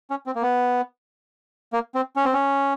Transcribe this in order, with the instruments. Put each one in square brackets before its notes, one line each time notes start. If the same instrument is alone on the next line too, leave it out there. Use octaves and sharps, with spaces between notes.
[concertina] C#4
C4
A#3
B3
A#3
C4
C#4
C4
C#4